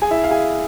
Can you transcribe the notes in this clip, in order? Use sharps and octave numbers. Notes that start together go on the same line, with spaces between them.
G#4 G#5
E4 E5
F5
G#4 G#5